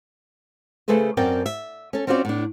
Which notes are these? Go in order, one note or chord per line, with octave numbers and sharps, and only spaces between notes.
C#3 A3 G#4 A4 B4 C5
F#2 C4 A#4 D5 G5 A5
E5
C#4 A4
C4 C#4 F4 F#4 C5 D5
A2 D4